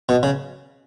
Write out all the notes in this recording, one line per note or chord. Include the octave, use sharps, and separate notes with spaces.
B2
C#3